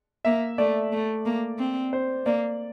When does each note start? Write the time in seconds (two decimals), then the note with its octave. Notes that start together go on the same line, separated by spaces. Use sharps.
0.25 A#3 E5
0.58 A3 D5
0.92 A3
1.25 A#3
1.59 C4
1.93 C5
2.26 A#3 D5